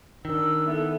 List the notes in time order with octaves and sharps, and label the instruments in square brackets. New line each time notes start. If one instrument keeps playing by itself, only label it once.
[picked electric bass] D#3 [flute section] D4 A#4 E6
[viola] B3 A4 [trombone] E4